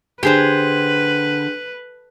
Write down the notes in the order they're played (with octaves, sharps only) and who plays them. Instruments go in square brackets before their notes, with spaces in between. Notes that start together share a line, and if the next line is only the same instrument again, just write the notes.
[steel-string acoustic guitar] D3 [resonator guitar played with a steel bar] G4 G#4 C5 [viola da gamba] B4